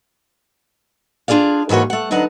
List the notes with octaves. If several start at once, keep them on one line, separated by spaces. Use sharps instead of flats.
D4 F4 G#4 D5 F5
G#2 E3 A#3 F#4 C#5
A3 F#5
D2 F#3 B3 D4 D#4 F#5